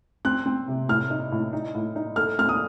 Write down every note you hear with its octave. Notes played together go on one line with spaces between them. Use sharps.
C4 F#6
C4
C3
A2 F6
D#4
A2
D#4
A2
D#4
A3 F6
C4 F6
D#6